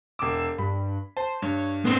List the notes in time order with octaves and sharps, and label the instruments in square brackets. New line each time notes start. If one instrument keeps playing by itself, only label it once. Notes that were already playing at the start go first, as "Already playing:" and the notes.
[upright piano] E1 D6 [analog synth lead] E6
[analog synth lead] G2 [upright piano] B5
[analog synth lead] C5 [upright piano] A5
[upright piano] G2 [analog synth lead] C#5
[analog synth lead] A2 [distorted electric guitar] B3 C4